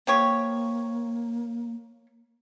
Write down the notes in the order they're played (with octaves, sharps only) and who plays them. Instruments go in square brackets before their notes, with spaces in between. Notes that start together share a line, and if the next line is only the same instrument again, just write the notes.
[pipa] F3 G4 C#5 [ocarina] A#3